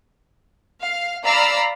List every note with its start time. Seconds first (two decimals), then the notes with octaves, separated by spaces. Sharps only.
0.80 F5
1.25 D5 F5 A#5 B5 E6